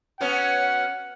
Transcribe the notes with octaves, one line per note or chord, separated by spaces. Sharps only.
F#3 B3 C#4 F#5